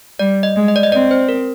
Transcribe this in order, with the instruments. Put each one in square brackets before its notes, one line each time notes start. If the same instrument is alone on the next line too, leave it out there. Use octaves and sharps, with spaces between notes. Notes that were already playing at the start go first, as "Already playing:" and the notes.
[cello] G3 [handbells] D5
[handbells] D#5
[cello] G#3
[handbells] D#5
D5
D#5
[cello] C4 [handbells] D5
[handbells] C5
A#4